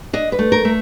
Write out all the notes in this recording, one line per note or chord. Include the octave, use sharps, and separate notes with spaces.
D4 D#5
B4
A3
A#4
A3